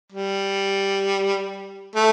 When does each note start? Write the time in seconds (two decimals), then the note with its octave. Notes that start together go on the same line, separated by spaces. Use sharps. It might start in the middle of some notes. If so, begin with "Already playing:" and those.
0.12 G3
1.96 A3